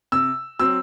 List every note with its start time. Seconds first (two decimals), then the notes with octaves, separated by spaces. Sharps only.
0.12 C3 E6
0.59 F#3 C4 E6